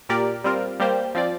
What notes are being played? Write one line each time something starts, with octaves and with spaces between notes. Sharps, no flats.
A#2 A#3 G4 A#4 D5
G3 C4 F4 A#4
G3 A#3 G4 C5
F3 C4 F4 D5